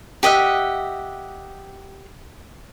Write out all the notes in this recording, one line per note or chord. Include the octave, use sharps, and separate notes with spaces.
G4 D#5 E5 F#5